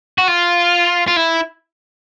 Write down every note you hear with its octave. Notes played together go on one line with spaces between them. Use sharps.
F#4
F4
F4
E4